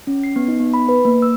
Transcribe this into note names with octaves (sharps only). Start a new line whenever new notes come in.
C#4
C7
B3
D#4
B3
B5
B4
A#3
E6